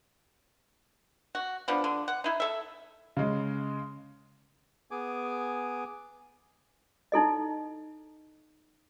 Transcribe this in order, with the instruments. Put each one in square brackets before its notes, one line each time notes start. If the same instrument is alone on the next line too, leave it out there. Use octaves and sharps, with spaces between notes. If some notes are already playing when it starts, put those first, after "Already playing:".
[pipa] F#4
F3 B3 D4
D3
F#5
D#4 E4
A4 E5
[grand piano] C#3 G#3
[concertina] B3 G#4 G#5 D6
[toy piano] D#4 E4 A4 D#5